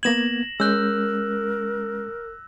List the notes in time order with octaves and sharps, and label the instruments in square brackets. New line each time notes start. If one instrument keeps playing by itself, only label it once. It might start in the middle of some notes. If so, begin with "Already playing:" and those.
[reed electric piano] A#3 B3 G#6 [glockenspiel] A#6 E7 F#7
[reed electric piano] G#3 C#4 G6 [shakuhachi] A#4 [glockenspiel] E6 F#6